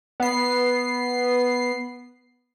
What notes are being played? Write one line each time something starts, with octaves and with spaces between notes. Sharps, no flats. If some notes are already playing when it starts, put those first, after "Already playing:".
B3 C7